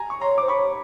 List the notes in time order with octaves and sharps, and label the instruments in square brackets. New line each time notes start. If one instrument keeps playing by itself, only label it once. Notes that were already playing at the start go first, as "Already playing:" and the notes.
Already playing: [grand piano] G#5 A#5
C#6
[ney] C#5 [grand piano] A#5 C6
[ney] C5 [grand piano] D6
[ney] C#5 [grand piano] B5 C#6